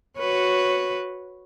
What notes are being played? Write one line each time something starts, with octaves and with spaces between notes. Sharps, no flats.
F#4 B4 C#5